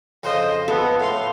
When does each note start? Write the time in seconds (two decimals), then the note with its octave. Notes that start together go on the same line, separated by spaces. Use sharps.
0.23 F2 C#3 F4 C5 D#5
0.68 B3 A4
1.00 A2 F5 C6